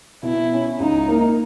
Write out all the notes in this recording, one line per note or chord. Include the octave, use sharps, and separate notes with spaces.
B2 E4
C#4
C#2 D#4
A#3